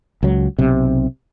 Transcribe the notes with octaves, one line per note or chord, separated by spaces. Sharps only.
C#2 F#3
B1 C3